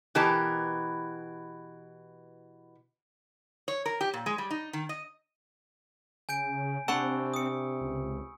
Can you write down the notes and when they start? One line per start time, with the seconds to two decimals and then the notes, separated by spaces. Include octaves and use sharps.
0.15 B2 E3 G4 A#4 A5
3.68 C#5
3.86 A#4
4.01 G4
4.14 A#2
4.26 G#3
4.38 G3
4.50 D#4
4.73 D#3
4.89 D#5
6.29 C#3 G#5 G6 D7
6.88 C3 C4 D4 F#5 A5 B5 C#6 E6
7.34 D#6 C#7
7.81 C#2